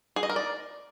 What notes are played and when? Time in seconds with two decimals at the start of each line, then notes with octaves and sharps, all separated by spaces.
0.16 G#4
0.23 D#5
0.30 A#4
0.36 D5